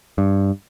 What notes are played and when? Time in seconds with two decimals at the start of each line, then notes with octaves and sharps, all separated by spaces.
0.18 G2